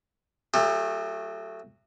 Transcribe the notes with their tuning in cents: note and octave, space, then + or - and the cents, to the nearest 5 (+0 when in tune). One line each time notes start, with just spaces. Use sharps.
F#3 -5 A3 +15 G4 +45